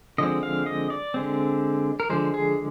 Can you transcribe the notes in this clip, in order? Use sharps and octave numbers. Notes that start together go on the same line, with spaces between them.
D3 F3 G#3 C4 D#5
F5
D#5
D5
D3 G#3 C4
A#4
D3 F3 G#3 C5
G#4